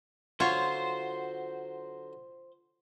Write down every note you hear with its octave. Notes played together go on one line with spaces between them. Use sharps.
D3 F#3 F4 C5 C#5